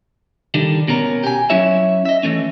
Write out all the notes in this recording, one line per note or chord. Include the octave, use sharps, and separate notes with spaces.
D3 D#3 G3
B2 C#4 A#4
G4 G#5
F#3 C#4 E4 C#5 E5
D#5 E5
E3 F3 A3 C#4